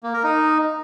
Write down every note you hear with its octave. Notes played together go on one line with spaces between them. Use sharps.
A#3
A#4
D#4